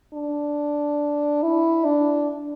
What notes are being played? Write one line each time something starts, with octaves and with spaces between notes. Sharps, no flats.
D4
E4
D4